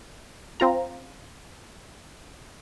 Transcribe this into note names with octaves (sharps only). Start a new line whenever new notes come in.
C4 F4 A#5